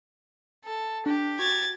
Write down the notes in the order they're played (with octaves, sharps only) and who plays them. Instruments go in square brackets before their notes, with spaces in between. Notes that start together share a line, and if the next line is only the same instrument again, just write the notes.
[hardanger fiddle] A4
[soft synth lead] D4 [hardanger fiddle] G4
[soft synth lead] F#4 [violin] G#6 A6